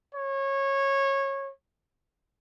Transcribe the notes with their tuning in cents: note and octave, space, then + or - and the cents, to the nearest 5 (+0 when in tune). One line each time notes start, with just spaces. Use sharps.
C#5 -20